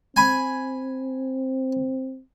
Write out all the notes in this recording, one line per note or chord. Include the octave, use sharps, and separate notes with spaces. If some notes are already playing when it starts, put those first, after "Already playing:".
C4 G#5 B5